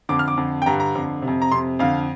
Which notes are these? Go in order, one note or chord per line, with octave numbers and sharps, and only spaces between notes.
F2 D3 D6
F6
D6
F2 D3
G5
G2 D3 A#5
A#5
F2 D3
C3
F2
A#5
F2 C3 C6
F2 D3 F5